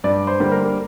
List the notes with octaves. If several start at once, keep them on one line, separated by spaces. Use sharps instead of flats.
G2 D5
C5
D3 G3 A#3
A#4